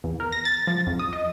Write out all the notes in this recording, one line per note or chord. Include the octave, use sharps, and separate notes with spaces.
E2
A#4
A#6
A6
F3
F2
D#6
D#5